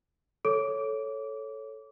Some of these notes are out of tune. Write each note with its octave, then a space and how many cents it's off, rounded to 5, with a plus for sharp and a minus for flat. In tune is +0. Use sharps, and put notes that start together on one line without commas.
A4 -5 C#5 +0 D6 -25